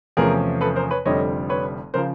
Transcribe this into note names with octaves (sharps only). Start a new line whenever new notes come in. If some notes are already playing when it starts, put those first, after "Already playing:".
E2 C3 F3 A3 C#4 G#4 A#4
A4 B4
A#4 C5
B4 C#5
F1 F2 D3 G3 C4 C#5 D#5
B4 C#5
C#3 F3 A#4 C5